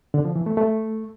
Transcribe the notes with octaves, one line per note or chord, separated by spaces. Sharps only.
D3
F3
E3
A3
A3